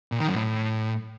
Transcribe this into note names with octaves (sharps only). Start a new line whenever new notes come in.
A#2
D#3
F#2
A2